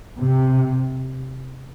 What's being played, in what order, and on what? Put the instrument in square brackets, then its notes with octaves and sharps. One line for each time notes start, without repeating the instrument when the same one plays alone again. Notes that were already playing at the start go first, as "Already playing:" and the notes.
[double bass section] C3